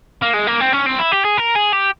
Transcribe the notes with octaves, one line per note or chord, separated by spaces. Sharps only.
A#3
G#3
A#3
C4
C#4
C4
E4
G4
G#4
A#4
G#4
G4